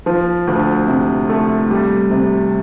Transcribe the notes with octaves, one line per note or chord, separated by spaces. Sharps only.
F3
D2
C3
A3
G3
C3